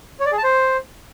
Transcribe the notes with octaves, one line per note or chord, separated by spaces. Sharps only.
C#5
D5
G#4
A5
C5